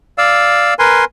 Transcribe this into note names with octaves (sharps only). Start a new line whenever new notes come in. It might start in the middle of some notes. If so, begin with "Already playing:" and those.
D5 F5 E6
A#4 B4 G#5 C6